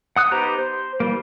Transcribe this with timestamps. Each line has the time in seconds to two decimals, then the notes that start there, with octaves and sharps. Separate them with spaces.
0.16 F#5 D#6 F#6
0.31 B3 D#4 G4 C5 A#5
0.58 C5
1.00 E3 G3 A#3